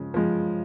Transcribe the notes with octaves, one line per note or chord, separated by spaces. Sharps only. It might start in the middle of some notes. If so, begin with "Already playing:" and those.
Already playing: C#3 F3 G#3
F3 G#3